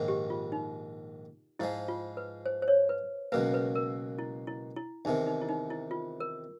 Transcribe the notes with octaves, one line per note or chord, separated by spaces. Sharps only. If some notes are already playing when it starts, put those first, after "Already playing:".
Already playing: A#1 G#2 D#3
G4
F4
D#4
G#2 F3 G#3 E4
F4
B4
C5
C5
C#5
B4
C#2 B2 F#3 A#3 B4
B4
A#4
E4
E4
E4
E2 C3 D#3 D#4
D#4
E4
D#4
E4
F4
A#4